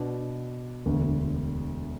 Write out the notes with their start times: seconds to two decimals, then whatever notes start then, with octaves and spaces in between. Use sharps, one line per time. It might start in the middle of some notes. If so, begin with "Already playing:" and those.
Already playing: B2 B3 D4
0.86 E1 D2 D3 B3